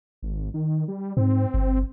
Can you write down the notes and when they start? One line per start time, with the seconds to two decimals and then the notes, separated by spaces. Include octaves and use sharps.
0.22 G#1
0.54 D#3
0.88 G3
1.17 G#2 C4
1.54 G1